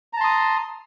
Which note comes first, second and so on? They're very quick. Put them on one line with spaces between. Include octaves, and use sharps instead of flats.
A#5 A5 C6 D#6